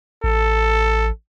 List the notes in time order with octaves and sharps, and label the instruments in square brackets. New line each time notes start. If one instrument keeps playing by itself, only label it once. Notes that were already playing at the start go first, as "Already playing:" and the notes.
[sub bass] A1 [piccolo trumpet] A4